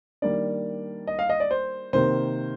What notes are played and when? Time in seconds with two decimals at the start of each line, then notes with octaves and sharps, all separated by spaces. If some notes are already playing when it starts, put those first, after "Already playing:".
0.22 D#3 G3 A#3 D4 D5
1.07 D#5
1.19 F5
1.29 D#5
1.40 D5
1.51 C5
1.93 C3 D#3 A#3 C5